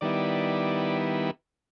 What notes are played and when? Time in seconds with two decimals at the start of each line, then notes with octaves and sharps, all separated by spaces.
0.01 D#3 G3 B3 E4 D5